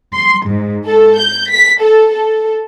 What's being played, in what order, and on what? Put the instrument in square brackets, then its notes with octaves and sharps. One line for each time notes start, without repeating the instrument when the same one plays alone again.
[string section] C6
G#2
A4
G6
B6
A4
A4